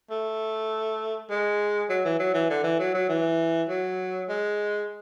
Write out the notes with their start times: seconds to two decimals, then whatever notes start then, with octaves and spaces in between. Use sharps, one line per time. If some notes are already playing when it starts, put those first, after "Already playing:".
0.10 A3
1.30 G#3
1.89 F#3
2.05 E3
2.20 F#3
2.34 E3
2.50 D3
2.64 E3
2.79 F#3
2.94 F#3
3.09 E3
3.69 F#3
4.29 G#3